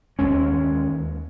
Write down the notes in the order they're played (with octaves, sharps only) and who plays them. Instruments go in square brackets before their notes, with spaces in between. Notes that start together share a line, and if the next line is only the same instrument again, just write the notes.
[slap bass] D#2 G#3 C#4